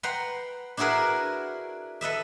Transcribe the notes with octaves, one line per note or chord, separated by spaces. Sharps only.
B4 F#5 G5 A#5 C6
D4 E4 F#4 G#4 A#4 B4
A4 B4 D#5 E5